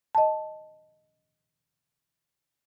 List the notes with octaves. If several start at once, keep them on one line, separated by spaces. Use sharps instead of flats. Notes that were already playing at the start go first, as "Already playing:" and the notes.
D#5 A5